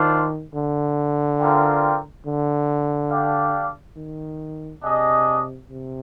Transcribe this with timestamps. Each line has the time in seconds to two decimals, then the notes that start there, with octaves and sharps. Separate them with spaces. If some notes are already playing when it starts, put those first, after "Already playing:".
Already playing: D#3 D4 F4 C5
0.54 D3
1.40 C4 F4 A#4 D5 G5
2.26 D3
3.11 D4 G4 D5 F5
3.96 D#3
4.83 C3 D4 G#4 D#5
5.69 C3